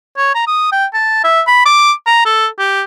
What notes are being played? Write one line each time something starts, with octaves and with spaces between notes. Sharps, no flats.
C#5
A#5
D#6
G5
A5
E5
B5
D6
A#5
A4
G4